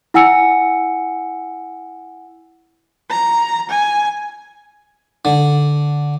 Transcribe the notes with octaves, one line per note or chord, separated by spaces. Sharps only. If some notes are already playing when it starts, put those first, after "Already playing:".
E4 F#5 G#5 E6 C#7
A#5
G#5
D3